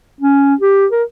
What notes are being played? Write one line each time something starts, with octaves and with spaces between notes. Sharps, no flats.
C#4
G4
A#4